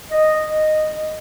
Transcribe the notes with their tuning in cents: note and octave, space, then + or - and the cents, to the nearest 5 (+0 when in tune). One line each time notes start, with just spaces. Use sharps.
D#5 -10